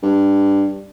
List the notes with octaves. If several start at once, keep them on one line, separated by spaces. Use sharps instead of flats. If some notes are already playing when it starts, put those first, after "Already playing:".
G2